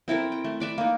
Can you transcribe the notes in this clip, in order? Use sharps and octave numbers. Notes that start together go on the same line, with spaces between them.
C4 E4 A4 A#4
G5
A3
B4 D5 E5
A#3 D#4